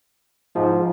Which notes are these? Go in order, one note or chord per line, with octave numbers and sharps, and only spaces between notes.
G#2 F3